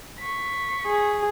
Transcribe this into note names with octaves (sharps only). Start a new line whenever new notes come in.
C#6 B6
G#4